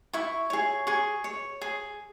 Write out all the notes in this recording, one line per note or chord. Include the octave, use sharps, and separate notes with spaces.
E4 C#6
G#4 C#5
G#4 C#6
C#5
G#4